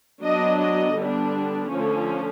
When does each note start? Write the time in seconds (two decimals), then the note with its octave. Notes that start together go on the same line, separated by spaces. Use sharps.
0.23 F#3 B3 D4 D#5
0.60 D#5
0.97 D3 G3 B3 D4
1.69 D3 F3 A3 C#4